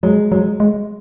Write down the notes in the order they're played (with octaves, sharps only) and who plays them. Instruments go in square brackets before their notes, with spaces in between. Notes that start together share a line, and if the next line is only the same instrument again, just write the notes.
[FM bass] F#3 [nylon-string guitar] G#3
[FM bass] F#3 [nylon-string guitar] G#3
[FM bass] G#3